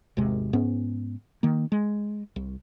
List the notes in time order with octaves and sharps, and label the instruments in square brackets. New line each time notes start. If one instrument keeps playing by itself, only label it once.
[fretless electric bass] G#1 E2 C3 G#3
G#2 B3 C#4
D#3 A#3
G#3
C2